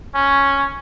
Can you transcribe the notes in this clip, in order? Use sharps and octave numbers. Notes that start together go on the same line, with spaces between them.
C#4